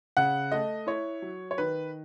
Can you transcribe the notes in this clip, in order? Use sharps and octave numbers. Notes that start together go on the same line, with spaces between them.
C#3 F#5
A3 D#5
E4 C#5
F#3
C#5
D#3 B4